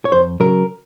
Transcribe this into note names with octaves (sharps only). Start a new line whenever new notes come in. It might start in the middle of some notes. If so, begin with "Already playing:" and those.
C#5
F2 C5
C#3 F#3 A#4